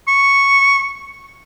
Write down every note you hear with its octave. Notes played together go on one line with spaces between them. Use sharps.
C#6